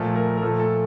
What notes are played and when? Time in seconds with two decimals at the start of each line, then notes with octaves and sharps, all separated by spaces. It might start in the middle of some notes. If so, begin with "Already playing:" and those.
Already playing: A#2 F3 A3
0.16 A#4
0.37 A#4
0.42 A#2 F3 A3 A4
0.59 A4